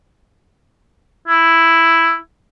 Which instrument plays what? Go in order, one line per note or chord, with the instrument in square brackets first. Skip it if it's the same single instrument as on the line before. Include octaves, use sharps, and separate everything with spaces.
[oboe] E4